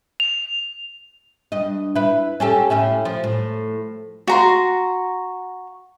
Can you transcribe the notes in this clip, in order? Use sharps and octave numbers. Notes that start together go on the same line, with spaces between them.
F7
G2 D#5
E4 B4
C#4 G4 A4
A2 C#4 E4
F3
A2
F#4 A#5 C6